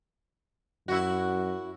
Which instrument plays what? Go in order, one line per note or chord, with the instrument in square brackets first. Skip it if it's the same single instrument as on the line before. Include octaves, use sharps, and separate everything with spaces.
[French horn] F#2 [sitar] E4 F#4